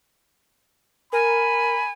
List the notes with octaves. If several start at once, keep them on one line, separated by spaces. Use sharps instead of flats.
A#4 G#5 B5